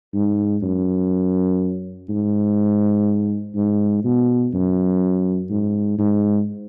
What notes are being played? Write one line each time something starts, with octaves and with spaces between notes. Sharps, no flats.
G#2
F#2
G#2
G#2
B2
F#2
G#2
G#2